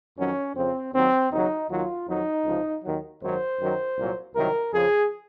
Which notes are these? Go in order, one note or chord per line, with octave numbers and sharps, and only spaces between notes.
F2 D#3 F#3 C#4
F2 C#3 F3 C4
D#2 D#3 F#3 C4
D#2 C#3 F#3 D#4
D#2 D#3 F#3 F4
F2 D#3 F#3 D#4
C#2 C3 F3
D#2 D#3 F#3
G#1 F#2 D#3 F#3 C5
F#2 D#3 F#3
C2 A#2 F#3
C2 C3 D#3 F#3 A#4
F2 C#3 F3 G#4